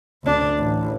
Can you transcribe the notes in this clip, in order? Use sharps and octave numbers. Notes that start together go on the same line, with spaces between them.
D2 D4
A1